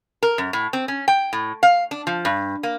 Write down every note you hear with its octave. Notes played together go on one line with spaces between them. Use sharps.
A#4
F#2
A2
C4
C#4
G5
A2
F5
D4
F3
G2
A#3